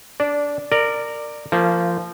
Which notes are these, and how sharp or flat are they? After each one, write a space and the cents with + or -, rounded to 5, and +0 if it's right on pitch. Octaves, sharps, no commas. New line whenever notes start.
D4 -15 D5 +0
A#4 -15 D5 +10
F3 -15 A#3 -30